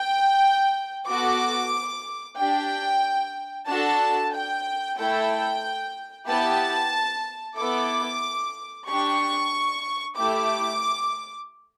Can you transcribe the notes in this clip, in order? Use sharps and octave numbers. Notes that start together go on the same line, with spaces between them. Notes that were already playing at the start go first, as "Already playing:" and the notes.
Already playing: G5
B3 F#4 A4 D6
D4 G4 G5
D4 F#4 A4 A5
G5
A3 E4 A4 G5
B3 E4 G4 A5
B3 E4 A4 D6
D4 G4 C#6
A3 E4 G4 D6